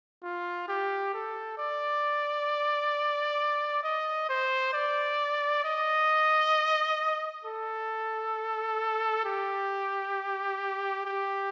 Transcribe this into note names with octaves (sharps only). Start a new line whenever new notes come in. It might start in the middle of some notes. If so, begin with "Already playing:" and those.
F4
G4
A4
D5
D#5
C5
D5
D#5
A4
G4
G4